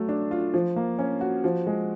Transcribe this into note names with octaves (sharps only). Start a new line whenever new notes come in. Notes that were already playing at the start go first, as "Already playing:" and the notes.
Already playing: F#3 A3
D4
F4
F3
A#3
C#4
F#4
F3
G#3